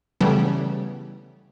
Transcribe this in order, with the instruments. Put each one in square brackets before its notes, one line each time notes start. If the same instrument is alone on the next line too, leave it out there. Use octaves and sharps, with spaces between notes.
[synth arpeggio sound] C#3 E3 G3 A3 B3